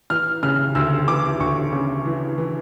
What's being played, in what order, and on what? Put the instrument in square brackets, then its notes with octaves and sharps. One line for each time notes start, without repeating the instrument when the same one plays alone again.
[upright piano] E3 F6
C#3 F6
D2 E6
E3 D6
D2 C#6
C#3
E3
E3